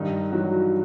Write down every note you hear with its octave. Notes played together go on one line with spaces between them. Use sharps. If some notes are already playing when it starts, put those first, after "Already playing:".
Already playing: G2 D#3 D#4
E3 F#3 F#4